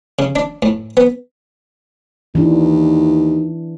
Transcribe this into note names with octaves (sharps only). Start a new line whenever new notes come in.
C#3
D4
A2
B3
D#2 E3 D4